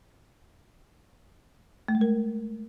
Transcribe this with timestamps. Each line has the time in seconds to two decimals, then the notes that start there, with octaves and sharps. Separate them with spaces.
1.88 A3
1.95 G#3
2.01 A#4